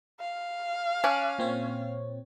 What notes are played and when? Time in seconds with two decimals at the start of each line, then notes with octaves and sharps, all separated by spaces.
0.20 F5
1.04 C#4 A5 D6 F#6
1.38 A#2 C4 C#5